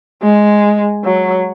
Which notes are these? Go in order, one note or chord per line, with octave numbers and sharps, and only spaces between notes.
G#3
F#3